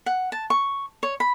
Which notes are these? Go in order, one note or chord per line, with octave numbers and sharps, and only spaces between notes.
F#5
A5
C#6
C#5
B5